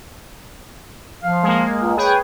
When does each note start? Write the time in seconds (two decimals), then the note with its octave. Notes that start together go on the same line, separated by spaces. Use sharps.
1.23 F3 F5
1.43 G#3 A#3
1.78 C#2
1.97 G#4 B4 C#5 G5